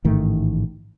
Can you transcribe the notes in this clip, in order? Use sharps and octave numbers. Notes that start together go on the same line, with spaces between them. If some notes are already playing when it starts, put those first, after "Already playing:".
A1 G#2 D#3 A3